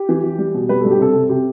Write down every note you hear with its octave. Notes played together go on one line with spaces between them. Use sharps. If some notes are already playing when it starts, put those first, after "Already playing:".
Already playing: G4
E3
E3
G3
B2
G3 B4
G2 A4
G4
C3 A4
C3
C3 G4